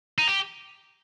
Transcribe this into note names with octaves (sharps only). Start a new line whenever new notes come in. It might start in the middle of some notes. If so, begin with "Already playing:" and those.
D#4
G4